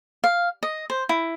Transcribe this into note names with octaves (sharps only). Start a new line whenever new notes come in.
F5
D#5
C5
E4